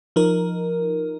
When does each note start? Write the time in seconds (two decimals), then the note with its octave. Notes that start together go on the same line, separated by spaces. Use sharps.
0.16 F3 D#4 A#4